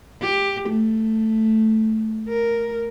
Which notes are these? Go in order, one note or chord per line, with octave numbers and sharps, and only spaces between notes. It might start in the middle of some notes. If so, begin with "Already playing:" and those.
G4
A3
A#4